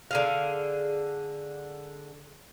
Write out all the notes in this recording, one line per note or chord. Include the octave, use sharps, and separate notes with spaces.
D3 G#4 F5